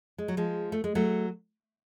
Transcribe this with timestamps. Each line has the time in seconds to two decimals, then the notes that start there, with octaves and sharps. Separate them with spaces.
0.18 G#3
0.28 F#3
0.37 F3 G#3
0.72 A3
0.84 G#3
0.95 F#3 A3